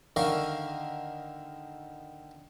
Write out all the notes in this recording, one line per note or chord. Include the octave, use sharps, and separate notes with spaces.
D3 D#3 A#4 F5 C#6